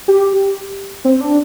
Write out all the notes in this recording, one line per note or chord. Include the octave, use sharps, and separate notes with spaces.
G4
C4
D4